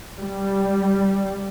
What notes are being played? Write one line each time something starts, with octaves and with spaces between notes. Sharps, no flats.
G3